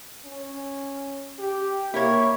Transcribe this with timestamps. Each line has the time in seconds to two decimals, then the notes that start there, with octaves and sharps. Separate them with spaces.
0.25 C#4
1.39 G4
1.94 A#3 E4 C#5